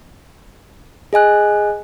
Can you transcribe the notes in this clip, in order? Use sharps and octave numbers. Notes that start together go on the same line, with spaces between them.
G#4 D#5 G#5 F#6